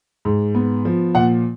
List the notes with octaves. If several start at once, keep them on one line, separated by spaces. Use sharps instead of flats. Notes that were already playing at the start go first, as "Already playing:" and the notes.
G#2
B3
F3
A#2 F#5